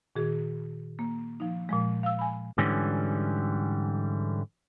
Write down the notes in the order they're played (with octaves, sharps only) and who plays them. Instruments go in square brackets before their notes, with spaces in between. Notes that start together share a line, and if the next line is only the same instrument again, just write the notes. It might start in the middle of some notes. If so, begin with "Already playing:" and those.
[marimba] A#2 D#3 F#4 G#4
A#3
F3 D#4
A#2 F3 G#3
F5 E6
G#5 B5
[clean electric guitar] G#2 D3 E3 G3 C#4